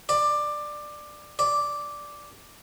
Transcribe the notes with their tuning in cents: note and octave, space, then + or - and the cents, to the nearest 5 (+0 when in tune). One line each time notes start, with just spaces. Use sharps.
D5 +15
D5 -5